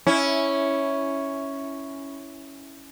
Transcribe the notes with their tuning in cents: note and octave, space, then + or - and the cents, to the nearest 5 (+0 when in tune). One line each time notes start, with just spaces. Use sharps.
C#4 +0 E4 -10